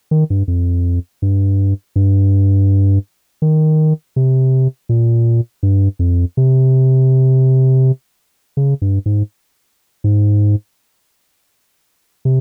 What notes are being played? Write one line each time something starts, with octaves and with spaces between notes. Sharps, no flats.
D#3
G2
F2
G2
G2
D#3
C3
A#2
G2
F2
C3
C#3
G2
G#2
G#2
C3